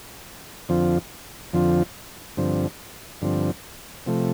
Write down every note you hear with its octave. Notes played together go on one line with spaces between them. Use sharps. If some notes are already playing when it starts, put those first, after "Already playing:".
F2 D3 F3 C4 F4
F2 D3 F3 C4 F4
G2 D3 F3 C4
G2 D3 F3 C4
C3 F3 A3